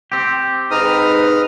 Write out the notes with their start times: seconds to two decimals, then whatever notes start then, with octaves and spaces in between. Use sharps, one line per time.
0.12 C4 G4
0.71 G#2 D#4 B4 A#5 D#6 F6